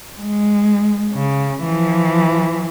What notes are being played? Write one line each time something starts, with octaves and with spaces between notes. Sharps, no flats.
G#3
C#3
E3 F3